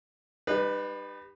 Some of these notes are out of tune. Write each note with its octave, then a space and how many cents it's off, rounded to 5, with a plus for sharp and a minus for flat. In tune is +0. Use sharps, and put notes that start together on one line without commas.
G3 +15 D#4 -40 B4 +0